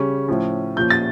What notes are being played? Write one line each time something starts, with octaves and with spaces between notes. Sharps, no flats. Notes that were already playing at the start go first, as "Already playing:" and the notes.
Already playing: C#3 G3 C#4
A2 F3 C#4
A#2 F3 C#4 G6
A6